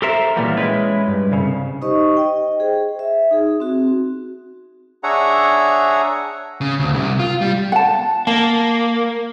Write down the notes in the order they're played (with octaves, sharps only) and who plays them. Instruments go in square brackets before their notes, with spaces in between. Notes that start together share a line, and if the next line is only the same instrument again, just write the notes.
[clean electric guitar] G4 A4 A#4 C5 E5
A#2 E3 F#3 G3 A#3 B3
G#3 C#4 E4 B4
G2
C2 C#3
[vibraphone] D#4 G4 C5 D#5 C#6
D#5 G5
G#4 C5
E5
D#4 G#4
C4 F#4
[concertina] D4 G#4 C#5 E5 F#5 A#5
[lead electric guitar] C#3
D2
C2
F4
G3
[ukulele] F#5 A5
[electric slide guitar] A#3 [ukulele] A5